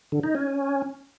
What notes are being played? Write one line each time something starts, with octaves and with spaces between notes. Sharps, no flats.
D3
D#4
C#4